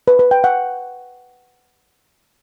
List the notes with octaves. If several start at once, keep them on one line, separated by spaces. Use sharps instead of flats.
B4
B4
G5
F#5